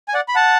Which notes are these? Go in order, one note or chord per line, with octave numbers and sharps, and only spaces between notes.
G#5
D5 F#5
B5
F#5 A5